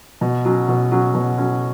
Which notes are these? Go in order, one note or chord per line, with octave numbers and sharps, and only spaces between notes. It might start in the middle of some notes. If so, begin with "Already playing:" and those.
B2
F#3 C#4
B2
F#3 C#4
B2
F#3 C#4